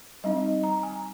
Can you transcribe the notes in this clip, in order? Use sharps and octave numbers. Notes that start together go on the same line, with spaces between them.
G3 C4 D#4 D#5
A#5
G#5